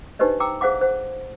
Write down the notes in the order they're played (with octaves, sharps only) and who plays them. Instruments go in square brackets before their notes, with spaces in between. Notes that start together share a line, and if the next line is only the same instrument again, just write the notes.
[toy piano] D4 D#4 G4 B4 C5 D#5
G5 A#5 D6 E6
G#4 C5 F5 F#5 D6
C5 F#5